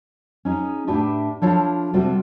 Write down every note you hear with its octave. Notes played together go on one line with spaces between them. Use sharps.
C#4 D#4 G#4
A2 D4 G4 B4 E5 A5
F3 D4 E4 F4 A4 C#5
C3 G3 C4 F4 F#4 A4